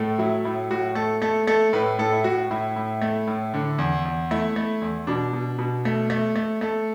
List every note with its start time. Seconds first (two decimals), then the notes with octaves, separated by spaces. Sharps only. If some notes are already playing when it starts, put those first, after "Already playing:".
Already playing: A2 A3
0.18 F#3 E4
0.45 A2 E4
0.70 A2 F#4
0.95 A3 A4
1.22 A3 A4
1.47 A3 A4
1.73 A2 B4
1.99 A2 A4
2.12 E4
2.24 A2 F#4
2.51 A2 E4
2.76 A2
3.02 A3
3.27 A2
3.54 D3
3.78 E2
4.05 E2
4.31 A3 E4
4.56 A3
4.81 E2
5.07 B2 D4
5.33 B2
5.59 B2
5.85 A3
6.10 A3
6.36 A3
6.61 A3 A4